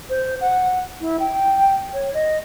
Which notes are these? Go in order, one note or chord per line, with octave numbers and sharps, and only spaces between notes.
C5
F#5
E4
G5
C#5
D#5